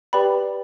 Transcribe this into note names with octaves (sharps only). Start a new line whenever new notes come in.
G4 B4 D5 G5 B5